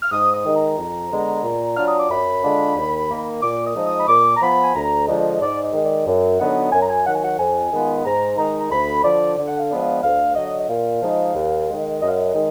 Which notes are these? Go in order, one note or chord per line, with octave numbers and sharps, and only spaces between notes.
F6
G#2 D#6
D#6
D#3 G#3 D#4
A#5
F2
D3 G#3 B3
A#2
F#3 D4 F4 F6
D#6
D6
F#2 B5
D3 G#3 D4 F4
D#2
D#3 A#3
A#2 D6
D#6
F3 G#3 D#4
D#6
B5
A#2 D6
A#5
F3 B3 F4 B5
G#5
D2 A#5
D3 F3 G#3 D4 D#5
G#2 D5
D#5
D#3 G#3
D5
F#2
D3 F#3 B3 D#4 F#5
F#2 G#5
A#5
G#5
D#3 F#3 F#5
G#5
F#5
F2 G#5
D#3 G#3 B3 F4
G#2 A#5
D#3 G#3 D#4 A#5
A#5
D2 B5
D3 F3 D5
D3
F#5
F5
F3 G#3 B3 D4
F5
D2 F5
D3 F#3 D#5
D#5
A#2 F5
F3 G#3 D#4
D#2
D#3 G#3
F#2 D#5
F5
D#5
D#3 G#3 D#4